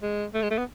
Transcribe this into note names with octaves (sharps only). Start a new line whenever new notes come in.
G#3
A3
G#3
A3
B3